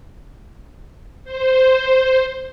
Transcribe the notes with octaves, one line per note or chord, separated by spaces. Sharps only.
C5